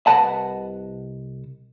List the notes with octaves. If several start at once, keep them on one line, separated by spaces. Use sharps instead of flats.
C2 C3 B4 D#5 F#5 A5